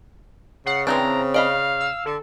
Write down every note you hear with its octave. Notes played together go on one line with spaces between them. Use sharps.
C#3 F#5 C7
E3 F#3 C4 D4 A#5
D5 D#5 F5 B5
E6
D3 A4